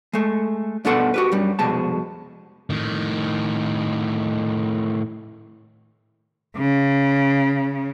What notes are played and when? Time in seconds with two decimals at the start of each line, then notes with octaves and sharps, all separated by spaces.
0.13 G#3 A3
0.85 G2 B2 B3 A4 F#5 C6
1.14 F#4 G4 B4
1.32 F#2 G3
1.59 C2 F2 B2 G#3 A5
2.70 A2 D#3
6.57 C#3